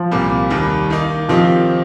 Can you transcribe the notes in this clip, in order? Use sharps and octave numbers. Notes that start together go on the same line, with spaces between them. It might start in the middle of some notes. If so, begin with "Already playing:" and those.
Already playing: F3
C2 A#2 G3 A#3
D#2 D#3 G3
D#3 A#3 D#4
D#3 F3 C4 D#4 G4